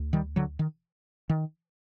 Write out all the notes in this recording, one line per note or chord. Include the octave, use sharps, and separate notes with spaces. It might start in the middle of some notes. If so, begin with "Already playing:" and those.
Already playing: D2
D#3 G3
D3 F#3
D#3
D#3